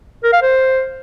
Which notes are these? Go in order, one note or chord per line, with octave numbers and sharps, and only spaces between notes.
A#4
F5
C5